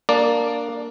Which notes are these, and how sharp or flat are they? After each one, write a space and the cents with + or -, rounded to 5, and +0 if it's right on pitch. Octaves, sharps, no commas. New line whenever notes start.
A#3 +0 D4 +0 D5 +5